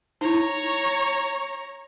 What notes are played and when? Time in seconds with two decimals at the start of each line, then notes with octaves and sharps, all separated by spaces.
0.21 D#4 E4 C#5 A#5